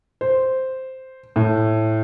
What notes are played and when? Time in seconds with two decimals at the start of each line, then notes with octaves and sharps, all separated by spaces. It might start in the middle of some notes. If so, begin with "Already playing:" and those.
0.21 C5
1.36 A2